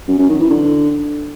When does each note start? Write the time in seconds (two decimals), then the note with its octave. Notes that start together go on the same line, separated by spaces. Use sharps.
0.08 F#2
0.19 F#2
0.29 D#3
0.40 E3
0.50 D3